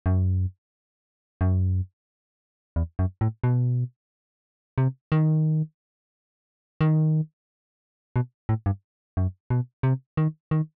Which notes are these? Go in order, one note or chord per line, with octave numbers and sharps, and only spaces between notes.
F#2
F#2
E2
F#2
A2
B2
C3
D#3
D#3
B2
A2
G2
F#2
B2
C3
D#3
D#3